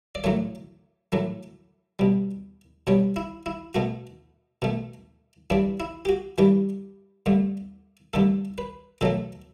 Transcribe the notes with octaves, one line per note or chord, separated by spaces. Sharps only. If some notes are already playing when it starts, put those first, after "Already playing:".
D5
A2 F#3 A3 C#5
A2 F#3 A3
B2 G3
B2 G3 C#5
E4
E4
B2 A3 F#4
B2 A3
G2 E3 G3 D4
E4
G4
F#4
G2 E3 G3 G4
G2 D3 A3
G2 D3 A3 A4
B4
B2 F#3 A3 A4